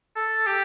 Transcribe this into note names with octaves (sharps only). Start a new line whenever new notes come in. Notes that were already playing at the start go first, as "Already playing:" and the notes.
A4
G4